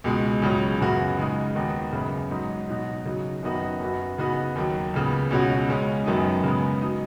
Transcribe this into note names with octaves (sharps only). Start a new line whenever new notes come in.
C#2 B2 G#3
C#2 C#3 F#3 C#4
F#2 C#3 B3 F#4
C#3 G#3 D#4
D#2 D#3 B3 D#4 F#4
F#2 C#3 B3
G#2 F#3 D#4 F#4
B2 F#3 D#4 F#4
C#3 F#3 D#4
F#2 D#3 B3 D#4 F#4
F#2 F#3 B3 F#4
C#3 B3 D#4 F#4
D#2 D#3 F#3
C#2 C#3 B3
C#2 B2 G#3 C#4 F#4
C#3 G#3 C#4
F#2 D#3 F#3 B3 D#4
C#3 G#3 B3
F#3 D#4